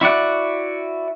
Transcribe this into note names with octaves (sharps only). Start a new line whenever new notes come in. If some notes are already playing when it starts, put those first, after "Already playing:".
E4 F#4 D5 F#5